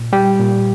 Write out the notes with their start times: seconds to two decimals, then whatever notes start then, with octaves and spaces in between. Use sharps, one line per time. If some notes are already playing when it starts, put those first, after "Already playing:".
Already playing: A#2
0.13 G3 G4
0.40 A#2